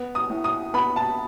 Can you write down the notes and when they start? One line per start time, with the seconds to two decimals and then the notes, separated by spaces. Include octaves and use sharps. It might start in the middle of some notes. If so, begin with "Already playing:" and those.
Already playing: B3
0.15 D#6
0.29 A2
0.44 D#6
0.74 B3 B5
0.96 A5